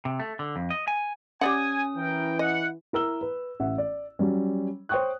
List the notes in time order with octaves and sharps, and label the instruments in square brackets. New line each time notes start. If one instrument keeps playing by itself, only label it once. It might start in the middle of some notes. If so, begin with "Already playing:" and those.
[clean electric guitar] C3
A3
D3
F2
D#5
G#5
[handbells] C#4 D#6 [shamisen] G4 D5 F#5 [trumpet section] G#5
[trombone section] E3 [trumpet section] A#4 G5
[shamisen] D#5 [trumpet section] F#5
[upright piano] E4 A#4 E6 G7
B4
A1 E5 F#5
D5
F#3 G3 C#4
C5 C#5 G5 C#6 D#6 F#6